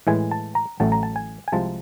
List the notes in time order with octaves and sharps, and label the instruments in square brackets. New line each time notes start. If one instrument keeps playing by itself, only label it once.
[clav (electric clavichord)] A2 E3 G#3 G#5
A5
A#5
A1 A2 F#3 A3 A5
A#5
A5
G#5
G#5
C2 C3 F3 G#3 A5